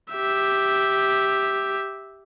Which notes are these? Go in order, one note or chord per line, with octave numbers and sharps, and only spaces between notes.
G4 E5